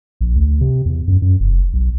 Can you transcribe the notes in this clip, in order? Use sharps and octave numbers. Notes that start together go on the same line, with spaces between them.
A#1
D2
C3
E2
F#2
F#2
F1
B1